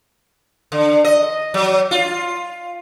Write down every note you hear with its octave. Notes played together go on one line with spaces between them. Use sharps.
D3
D#5
F#3
F4